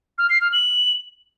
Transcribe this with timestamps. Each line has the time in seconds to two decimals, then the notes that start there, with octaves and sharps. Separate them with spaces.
0.18 F6
0.30 C7
0.41 F6
0.53 F#7